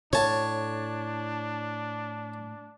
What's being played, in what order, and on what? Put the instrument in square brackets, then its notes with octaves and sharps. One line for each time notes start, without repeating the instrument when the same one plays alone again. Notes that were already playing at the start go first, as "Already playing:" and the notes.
[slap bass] A2 [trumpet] D4 [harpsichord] C#5 A5